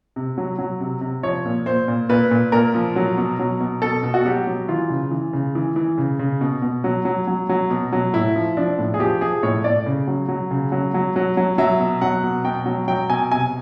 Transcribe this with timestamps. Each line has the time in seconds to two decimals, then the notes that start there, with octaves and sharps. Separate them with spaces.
0.16 C3
0.38 F#3
0.59 F#3
0.80 C3
1.01 C3
1.23 F3 C#5
1.45 A#2
1.66 A#2 C5
1.88 A#2
2.09 A#2 B4
2.31 A#2
2.52 A#2 A#4
2.75 F3
2.96 F#3
3.17 B2
3.39 F#3
3.60 B2
3.82 B2 A4
4.03 B2
4.14 F#4
4.25 F#3 G4
4.47 F#3
4.68 E3 F4
4.90 C#3
5.11 E3
5.33 C#3
5.55 E3
5.76 E3
5.98 C#3
6.19 C#3
6.41 B2
6.62 B2
6.84 F#3
7.05 F#3
7.27 F#3
7.49 F#3
7.70 B2
7.92 F#3
8.13 A2 E4
8.36 F3
8.57 F3 D4
8.78 A2
8.94 G#4
9.00 F3 G4
9.21 F3 G#4
9.43 A2 C#5
9.64 A2 D5
9.86 C#3
10.07 F#3
10.28 F#3
10.51 C#3
10.72 F#3
10.94 F#3
11.16 F#3
11.37 F#3
11.58 F#3 E5
11.80 B2
12.01 F#3 F#5
12.24 B2
12.45 B2 G5
12.66 F#3
12.88 F#3 G5
13.10 B2 G#5
13.31 C3 G#5